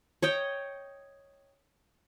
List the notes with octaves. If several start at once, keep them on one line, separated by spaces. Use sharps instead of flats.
C#5 D#5 G5